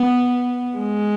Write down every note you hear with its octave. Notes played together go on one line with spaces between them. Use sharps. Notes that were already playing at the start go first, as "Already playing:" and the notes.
Already playing: B3
G#3